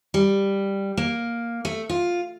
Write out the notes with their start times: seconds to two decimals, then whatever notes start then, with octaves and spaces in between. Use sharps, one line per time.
0.14 G3
0.97 A#3
1.65 A3
1.89 F4